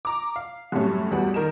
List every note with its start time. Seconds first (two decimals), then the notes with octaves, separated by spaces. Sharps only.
0.05 A#5 D6
0.36 F5
0.72 F#2 A2 C3 G3 A3 C#4
1.11 A1 E2 G3 B3 F#4
1.34 D#3 A#4 D#5 E7